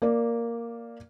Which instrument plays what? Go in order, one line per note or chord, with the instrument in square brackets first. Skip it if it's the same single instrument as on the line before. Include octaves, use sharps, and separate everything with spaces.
[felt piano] A#3 A#4 D5